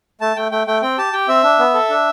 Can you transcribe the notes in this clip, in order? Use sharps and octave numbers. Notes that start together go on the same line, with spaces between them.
A3 A5
A3 G5
A3 G5
A3 G5
C4 G5
G4 A5
G4 G5
C4 E5
D4
B3
A4
D4